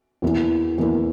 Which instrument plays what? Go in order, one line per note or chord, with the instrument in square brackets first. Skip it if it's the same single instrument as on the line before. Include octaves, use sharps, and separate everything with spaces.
[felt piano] E2 E3 A#3 E4
E2 E3 A#3 E4